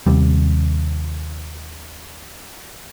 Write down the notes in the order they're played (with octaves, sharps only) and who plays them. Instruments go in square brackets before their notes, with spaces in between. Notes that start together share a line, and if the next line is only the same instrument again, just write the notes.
[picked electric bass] D#2 C3 G3